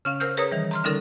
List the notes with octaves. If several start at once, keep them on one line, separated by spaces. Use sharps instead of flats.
C#3 C#4 F5
A#4 C5 E6 F6 G6
G#4 A#4 B4 C#5 A#5 D#6
D#3 E3 G3
A#5 C6 F6
D3 G3 C#4 D#4 A4 A#4